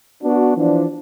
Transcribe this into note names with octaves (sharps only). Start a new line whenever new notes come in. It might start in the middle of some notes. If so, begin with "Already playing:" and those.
B3 D4 F#4
E3 F3 D4